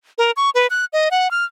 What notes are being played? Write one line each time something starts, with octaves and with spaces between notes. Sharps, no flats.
A#4
C#6
B4
F#6
D#5
F#5
F6